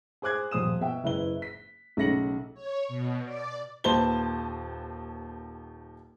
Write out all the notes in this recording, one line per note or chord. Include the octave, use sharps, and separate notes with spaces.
G#4 C5 D6 F#6 G#6
D#1 F3 C5 D#6 E7
B2 E5 G5
F#1 E4 B4 G7
B6
B1 C#3 A3 A#6 C#7 F#7
C#5
B2
D5
D#1 D#2 B4 C5 A5 G7